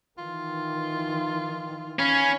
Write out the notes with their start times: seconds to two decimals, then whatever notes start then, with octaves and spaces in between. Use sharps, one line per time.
0.18 D#3 E3 F4
1.99 C#4 F5 G#5 B5